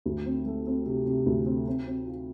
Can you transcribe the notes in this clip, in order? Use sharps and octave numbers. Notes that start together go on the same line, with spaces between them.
D2
C4
A3
C4
C3
C3
D2
C4
C4
C4
F4